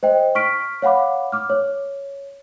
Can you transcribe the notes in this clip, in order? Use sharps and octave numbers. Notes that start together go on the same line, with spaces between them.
C5 D#5 G5
C#6 F6 B6 D7
C#5 F5 F#5 B5 D6
D6 F6
C#5